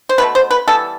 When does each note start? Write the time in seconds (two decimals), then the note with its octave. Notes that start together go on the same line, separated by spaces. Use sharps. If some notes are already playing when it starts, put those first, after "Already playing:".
0.09 C5
0.18 B2 A3 B4
0.35 C5
0.51 B4
0.68 E3 G3 B3 A4